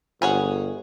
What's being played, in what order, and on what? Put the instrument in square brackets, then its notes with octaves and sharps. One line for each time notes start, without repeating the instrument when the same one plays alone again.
[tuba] G1 [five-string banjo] G#4 C#5 F#5